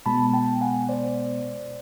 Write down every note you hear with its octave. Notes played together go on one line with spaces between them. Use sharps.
B2 G#3 B3 A5 B5
G5 A5
F#5 G#5
C5 D5